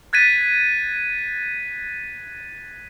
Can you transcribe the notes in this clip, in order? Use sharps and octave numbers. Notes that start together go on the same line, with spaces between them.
F#6 G#6 A6 B6 D#7